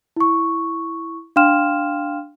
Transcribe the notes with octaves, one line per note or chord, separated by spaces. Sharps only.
E4 C#6
D4 F5 G5 C6 F6 E7